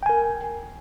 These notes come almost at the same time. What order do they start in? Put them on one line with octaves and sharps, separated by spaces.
G5 G#5 A#4